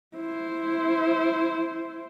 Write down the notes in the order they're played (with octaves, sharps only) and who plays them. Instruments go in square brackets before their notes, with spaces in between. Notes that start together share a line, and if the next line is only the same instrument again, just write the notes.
[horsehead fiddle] E4 C5